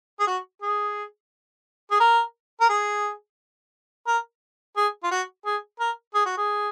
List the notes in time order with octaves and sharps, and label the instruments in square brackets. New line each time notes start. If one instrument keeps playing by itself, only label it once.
[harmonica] G#4
F#4
G#4
G#4
A#4
A#4
G#4
A#4
G#4
F4
F#4
G#4
A#4
G#4
F#4
G#4